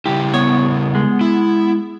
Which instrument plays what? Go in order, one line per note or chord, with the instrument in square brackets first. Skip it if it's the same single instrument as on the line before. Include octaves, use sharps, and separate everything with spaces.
[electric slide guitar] C#3 G3 E4 [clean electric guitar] G4
[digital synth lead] B3 [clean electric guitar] C#5
[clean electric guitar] G#3
[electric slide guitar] E4